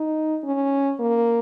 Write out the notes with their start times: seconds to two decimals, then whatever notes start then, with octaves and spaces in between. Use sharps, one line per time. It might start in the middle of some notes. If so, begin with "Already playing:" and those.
Already playing: D#4
0.44 C#4
0.99 A#3